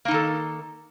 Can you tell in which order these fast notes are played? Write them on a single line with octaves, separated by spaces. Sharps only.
A#3 D#4 D#3 A4